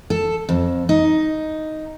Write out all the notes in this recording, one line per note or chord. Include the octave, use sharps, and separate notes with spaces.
A4
F2
D#4